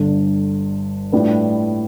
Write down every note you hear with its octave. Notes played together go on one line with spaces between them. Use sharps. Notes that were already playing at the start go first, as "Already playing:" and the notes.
Already playing: G1 G2 D3
A2 G3 D4 F4 B4